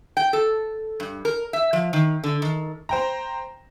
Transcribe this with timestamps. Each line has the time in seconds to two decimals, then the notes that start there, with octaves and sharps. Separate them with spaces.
0.17 G5
0.33 A4
1.00 G2
1.25 A#4
1.53 E5
1.73 F3
1.93 D#3
2.24 D3
2.42 D#3
2.89 C5 G5 A#5